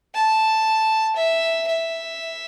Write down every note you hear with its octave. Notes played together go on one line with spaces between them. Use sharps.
A5
E5
E5